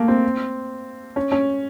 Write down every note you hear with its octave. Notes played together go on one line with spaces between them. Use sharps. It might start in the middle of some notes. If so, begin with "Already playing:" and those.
Already playing: A3 A#3
C4
C#4
C#4